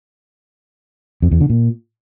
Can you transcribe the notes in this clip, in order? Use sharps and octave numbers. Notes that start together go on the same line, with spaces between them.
F2
E2
D3
A#2